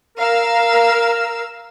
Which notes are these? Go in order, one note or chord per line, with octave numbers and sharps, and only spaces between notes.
A#4 F5 E6